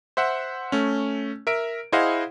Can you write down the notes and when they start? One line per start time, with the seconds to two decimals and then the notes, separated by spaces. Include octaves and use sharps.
0.17 C5 E5 F#5
0.72 A3 C#4
1.47 A#4 E5 D7
1.92 E4 G#4 C5 D#5 F5 F#5